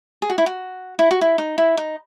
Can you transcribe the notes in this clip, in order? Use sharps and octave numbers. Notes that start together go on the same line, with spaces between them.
G#4
F#4
E4
F#4
E4
F#4
E4
D#4
E4
D#4